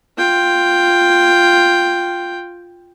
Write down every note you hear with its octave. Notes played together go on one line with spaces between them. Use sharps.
F4 G5